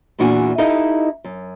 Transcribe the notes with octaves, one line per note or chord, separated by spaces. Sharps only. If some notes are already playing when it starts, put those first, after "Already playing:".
E2 A#2 E3 D4 F#4 G#5
D#4 E4 G4 A4 D#5 F5
F#2